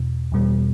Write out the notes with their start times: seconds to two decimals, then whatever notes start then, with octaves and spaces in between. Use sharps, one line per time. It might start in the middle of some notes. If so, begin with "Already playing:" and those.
Already playing: E2 B2
0.32 E2 B2 G3